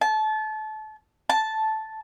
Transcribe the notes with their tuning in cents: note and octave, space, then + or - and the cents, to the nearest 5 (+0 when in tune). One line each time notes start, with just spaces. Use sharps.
A5 -25
A5 -5